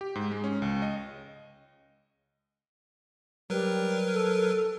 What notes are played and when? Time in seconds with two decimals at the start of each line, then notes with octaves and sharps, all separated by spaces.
0.01 G4
0.15 G#2
0.31 G#3
0.44 C#4
0.62 C#2
0.82 D#5
3.50 F#3 G3 A#4 B4
4.13 A4